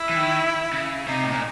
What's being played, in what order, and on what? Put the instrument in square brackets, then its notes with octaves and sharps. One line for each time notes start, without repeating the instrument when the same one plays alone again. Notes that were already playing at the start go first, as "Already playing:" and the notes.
Already playing: [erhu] E4
[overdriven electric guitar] E3
D#3
C#3
[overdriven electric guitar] C3 [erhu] D#4
[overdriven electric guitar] A2
A#2